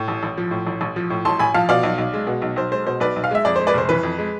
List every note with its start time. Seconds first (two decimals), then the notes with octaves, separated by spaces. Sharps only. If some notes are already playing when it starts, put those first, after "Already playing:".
Already playing: A2
0.08 A1
0.23 A1
0.37 F3
0.51 A2
0.67 A1
0.81 A1
0.96 F3
1.10 A2
1.25 A1 A5 C6
1.39 A1 G#5 B5
1.54 F3 F5 A5
1.69 B2 D5 F5
1.83 B1
1.98 B1
2.13 G#3
2.27 B2
2.42 B1
2.56 B1 C5
2.72 G#3 C5
2.87 B2 C5
3.00 B1 B4 D5
3.16 B1
3.24 F5
3.31 G#3 E5
3.45 F2 D5
3.56 C5
3.60 G#3
3.67 B4 D5
3.74 F1 C5
3.89 E3 B4
4.03 F2
4.19 G#3